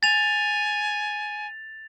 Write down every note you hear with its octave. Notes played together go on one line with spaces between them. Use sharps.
G#5 A6 F7